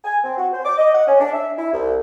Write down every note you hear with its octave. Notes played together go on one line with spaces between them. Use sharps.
G#5
C4
F#4
C5
D6
D#5
F#5
C#4
D4
E5
E4
C2